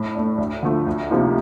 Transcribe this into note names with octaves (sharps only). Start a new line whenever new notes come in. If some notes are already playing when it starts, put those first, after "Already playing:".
Already playing: A2
A3 D4
D2
D3 F3 A3
D2
C3 F3 A#3 D#4